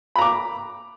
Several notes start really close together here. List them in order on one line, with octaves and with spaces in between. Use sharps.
B5 A#5 D6